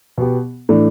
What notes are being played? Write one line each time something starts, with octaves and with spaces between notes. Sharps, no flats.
B2 B3 G4
A2 E3 A3 D4